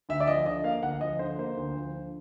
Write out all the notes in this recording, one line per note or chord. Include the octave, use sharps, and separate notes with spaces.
D2 E5
D5
F3 D#5
D3 D#5
A#3 F5
D2 F#5
F3 D#5
D3 C5
A#3 C5
D2
F3
D3